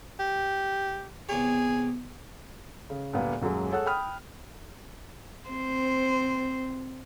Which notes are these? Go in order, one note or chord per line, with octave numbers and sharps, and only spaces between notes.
G4
E2 C3 G#4 C#5
C#3
D2 A#2 G3 A#3 B3
D#1 F#2 F#3 G#3
G#4 A4 C#5 F#5 F#6
G5 B5 D#6 F6
C4 C5